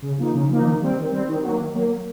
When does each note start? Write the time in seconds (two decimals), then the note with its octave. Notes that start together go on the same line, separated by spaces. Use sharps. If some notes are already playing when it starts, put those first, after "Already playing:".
0.02 C#3
0.18 F3 A#3 D#4
0.34 C#3
0.49 F3 A#3 D#4
0.65 D#3
0.81 G3 C4
0.97 D#3
1.11 G3 C4
1.28 D#3
1.43 F#3 A#3
1.58 D#3
1.74 F#3 A#3